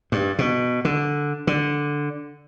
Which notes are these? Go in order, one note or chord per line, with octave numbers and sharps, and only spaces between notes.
G2
B2
D3
D3